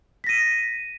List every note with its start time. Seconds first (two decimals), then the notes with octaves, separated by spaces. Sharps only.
0.24 B6
0.27 A#6
0.29 D#7